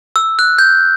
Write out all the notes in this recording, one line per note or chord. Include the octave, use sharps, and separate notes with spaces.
E6
F#6
G6